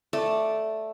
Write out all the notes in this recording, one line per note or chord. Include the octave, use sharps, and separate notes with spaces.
A3 D5